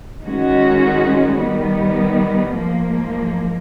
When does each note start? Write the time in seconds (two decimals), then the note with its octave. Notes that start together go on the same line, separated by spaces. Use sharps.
0.24 D#3 G#3 C#4 F#4
1.39 D#3 G3 B3
2.54 G#2 F3 A#3